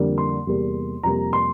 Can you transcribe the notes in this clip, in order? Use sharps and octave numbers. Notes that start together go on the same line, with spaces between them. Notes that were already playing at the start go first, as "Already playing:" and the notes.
Already playing: F2 D3 G3 A#3
C6
E2 C3 G3 A#3
F2 C3 G3 A#3 A#5
C6